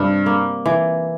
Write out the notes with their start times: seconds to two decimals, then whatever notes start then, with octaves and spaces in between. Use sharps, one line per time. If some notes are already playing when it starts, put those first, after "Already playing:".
Already playing: G2 C3 G3
0.26 A#3
0.66 E3